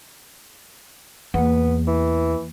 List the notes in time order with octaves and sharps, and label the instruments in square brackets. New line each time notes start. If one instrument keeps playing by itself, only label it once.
[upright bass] E2 [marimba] A#3 F#5 [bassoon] B3
[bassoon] E3